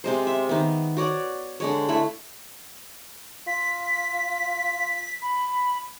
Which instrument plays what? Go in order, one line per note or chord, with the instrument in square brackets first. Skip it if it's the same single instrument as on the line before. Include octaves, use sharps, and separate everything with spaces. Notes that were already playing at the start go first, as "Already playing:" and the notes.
[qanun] C3 G#3 C5
E5
D#3 B3
F#4 C#5 D5
D3 G#3 C#5
A3 E4 B5
[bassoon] F4 [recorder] B6
[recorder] B5